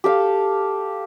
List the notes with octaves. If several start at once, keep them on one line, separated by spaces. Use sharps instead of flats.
G4 A4 F5